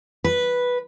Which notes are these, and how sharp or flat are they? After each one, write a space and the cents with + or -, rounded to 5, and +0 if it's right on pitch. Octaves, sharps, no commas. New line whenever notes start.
B4 -5